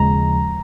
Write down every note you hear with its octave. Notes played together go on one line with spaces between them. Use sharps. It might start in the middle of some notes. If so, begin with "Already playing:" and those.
Already playing: D#2 C#3 F3 G#3 A#5